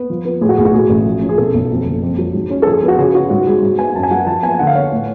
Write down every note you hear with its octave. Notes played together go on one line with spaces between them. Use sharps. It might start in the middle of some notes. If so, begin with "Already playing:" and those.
Already playing: B3
F3
B3
A2 G#4
F#4
B1 G#4
F#4
A2 G#4
A1
F3
C#4
G#4
B2 A4
B1
F2
F#1
F2
F#3
G#2
C#4
A4
F3 G#4
G#4
B3
F#4
C#3 G#4
G#4
C#4 F#4
G#2 F#4
G#3 G#4
G#2
B3 G#5
F#2 A5
G#5
F#3 F#5
G#5
F3 A5
B3 G#5
D3 F#5
F5
B3 C#5
A2